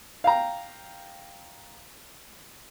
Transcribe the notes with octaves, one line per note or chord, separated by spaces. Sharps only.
F5 G5 A#5